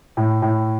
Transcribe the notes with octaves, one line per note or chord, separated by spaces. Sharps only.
A2
A2